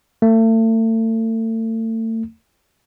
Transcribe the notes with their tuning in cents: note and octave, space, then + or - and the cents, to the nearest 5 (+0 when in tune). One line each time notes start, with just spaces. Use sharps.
A3 +35